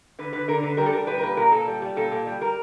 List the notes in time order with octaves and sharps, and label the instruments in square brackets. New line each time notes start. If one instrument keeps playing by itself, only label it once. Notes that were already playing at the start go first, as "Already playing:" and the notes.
[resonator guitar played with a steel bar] D3 B4
D3 B4
D3 A#4
D3 B4
G3 A#4
A4
G3 A#4
G3 B4
A#4
A#2 B4
A#2 A#4
A#2 A4
G3
G3
A#2 A4
A#2
G3
G3 A#4